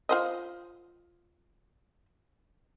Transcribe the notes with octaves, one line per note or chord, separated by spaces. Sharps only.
F4 C5 D#5